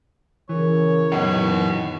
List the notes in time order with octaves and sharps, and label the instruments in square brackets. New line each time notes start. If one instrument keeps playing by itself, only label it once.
[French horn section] C#3 A#4 [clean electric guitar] E3 [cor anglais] C#5
[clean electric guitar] F#2 B3 A#4 [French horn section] D#3 E3 [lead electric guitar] D#5 F#5